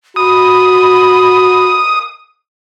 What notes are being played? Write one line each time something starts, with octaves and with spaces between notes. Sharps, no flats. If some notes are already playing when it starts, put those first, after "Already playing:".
F#4 B5 D#6